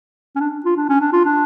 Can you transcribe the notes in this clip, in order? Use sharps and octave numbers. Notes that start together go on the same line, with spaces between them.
C#4
D4
F4
D4
C#4
D4
F4
D4